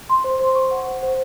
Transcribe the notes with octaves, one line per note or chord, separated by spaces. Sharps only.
C6
C5
C5
C#6
F#5
C5
C5